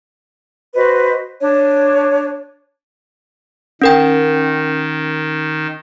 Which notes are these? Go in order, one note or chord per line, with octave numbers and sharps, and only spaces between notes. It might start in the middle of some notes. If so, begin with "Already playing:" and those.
F#4 B4 C5 D#5
D4 C#5
D#3 C#4 A#4 G5